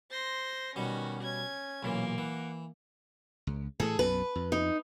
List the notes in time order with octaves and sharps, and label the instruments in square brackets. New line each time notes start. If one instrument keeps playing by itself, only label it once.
[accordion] C5 [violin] C6 A#6
[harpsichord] B2 G3 [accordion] D#3 [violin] C#4 F#4
[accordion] C#4 [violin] G#6
[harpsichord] B1 A#2 E3 [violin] A#3
[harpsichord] E3 [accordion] F#5
[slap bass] C#2
[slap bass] A2 E3 A3 [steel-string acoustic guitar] G#4 A4
[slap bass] B1 F#2 B2 [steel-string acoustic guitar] B4
[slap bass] F2
[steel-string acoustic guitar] D#4